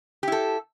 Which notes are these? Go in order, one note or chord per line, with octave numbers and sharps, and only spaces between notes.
E4 G4 A4